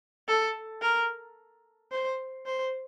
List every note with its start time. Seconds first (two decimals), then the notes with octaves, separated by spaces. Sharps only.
0.28 A4
0.82 A#4
1.92 C5
2.46 C5